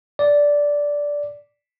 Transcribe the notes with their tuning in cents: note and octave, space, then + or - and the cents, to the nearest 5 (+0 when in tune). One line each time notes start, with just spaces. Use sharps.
D5 -10